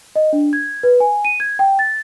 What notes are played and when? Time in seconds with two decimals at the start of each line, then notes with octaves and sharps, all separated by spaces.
0.16 D#5
0.33 D4
0.53 G#6
0.83 B4
1.00 G#5
1.25 D#7
1.40 G#6
1.59 G5
1.79 A6